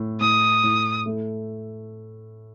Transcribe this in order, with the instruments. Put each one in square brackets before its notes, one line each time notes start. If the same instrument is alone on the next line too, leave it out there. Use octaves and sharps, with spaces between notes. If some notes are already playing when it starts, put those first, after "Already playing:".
Already playing: [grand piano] A2
[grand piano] A2 [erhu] D#6
[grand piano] A2
A3